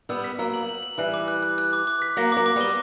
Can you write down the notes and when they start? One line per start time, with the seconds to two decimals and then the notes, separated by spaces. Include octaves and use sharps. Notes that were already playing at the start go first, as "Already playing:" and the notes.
0.09 G3 B3 E6
0.24 B6
0.39 F#3 A#3 E6
0.54 F#7
0.69 F#7
0.83 F#7
0.98 E3 G3 F#6
1.14 D6
1.28 F#6
1.43 F#6
1.58 F#6
1.73 D6
1.87 D6
2.02 B6
2.17 F#3 A#3 A#6
2.32 F#3 A#3 D6
2.46 D6
2.56 G3 B3 G7